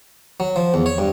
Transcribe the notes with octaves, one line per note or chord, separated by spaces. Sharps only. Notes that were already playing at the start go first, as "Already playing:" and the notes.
F#3
F3
E2
C#5
G2